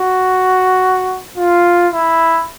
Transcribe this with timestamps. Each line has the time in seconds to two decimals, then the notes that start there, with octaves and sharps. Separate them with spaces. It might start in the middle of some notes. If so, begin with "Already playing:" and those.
Already playing: F#4
1.37 F4
1.93 E4